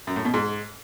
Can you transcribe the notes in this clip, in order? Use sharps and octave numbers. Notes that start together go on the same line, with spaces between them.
F#2
A2
B2
G#2